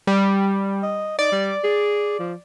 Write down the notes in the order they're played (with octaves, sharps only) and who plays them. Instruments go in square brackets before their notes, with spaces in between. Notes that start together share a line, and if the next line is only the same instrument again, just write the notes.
[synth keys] G3
[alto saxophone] D#5
[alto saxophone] D#4 [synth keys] D5
[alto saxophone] G3
G#4
F3